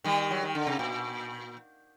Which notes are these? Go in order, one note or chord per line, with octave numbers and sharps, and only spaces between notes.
D#3 G3
F#3
D#3
D3
C3
A#2